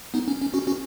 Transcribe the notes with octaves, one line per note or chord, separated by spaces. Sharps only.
B3 D#4
C#4
C#4
C#4 F#4
C#4 F#4